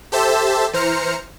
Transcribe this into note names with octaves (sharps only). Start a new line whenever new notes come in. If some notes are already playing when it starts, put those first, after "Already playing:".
G4 A4 C5 E5 A5 E6
E3 C5 A#5 F6 C#7